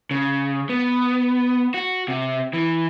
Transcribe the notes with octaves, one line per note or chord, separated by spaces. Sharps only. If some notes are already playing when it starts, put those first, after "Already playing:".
C#3
B3
F#4
C3
E3